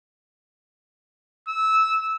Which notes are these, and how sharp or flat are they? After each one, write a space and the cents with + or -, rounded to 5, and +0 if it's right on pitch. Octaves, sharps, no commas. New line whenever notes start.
E6 -15